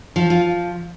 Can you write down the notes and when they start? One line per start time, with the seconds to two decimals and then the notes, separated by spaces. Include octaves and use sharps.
0.16 F3 F4
0.30 F4